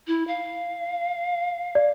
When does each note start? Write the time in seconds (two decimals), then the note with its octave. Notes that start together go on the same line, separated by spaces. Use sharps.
0.07 E4
0.28 F5
1.75 D5